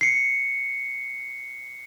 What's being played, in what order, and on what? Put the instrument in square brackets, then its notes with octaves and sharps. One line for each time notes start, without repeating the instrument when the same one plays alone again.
[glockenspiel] C7 C#7